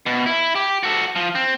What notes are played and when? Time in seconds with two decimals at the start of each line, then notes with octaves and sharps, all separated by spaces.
0.06 B2
0.26 E4
0.55 G4
0.83 F#4 A4
1.16 F3
1.35 C4